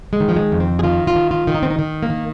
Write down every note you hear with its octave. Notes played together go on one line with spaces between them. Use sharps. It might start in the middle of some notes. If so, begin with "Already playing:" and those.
G#3
D#3
F3
G#3
F2
C4
G#4
D#3 F4
F4
D#3
F4
D#3
D#4
C4
D#4
D#3
A#3
D#3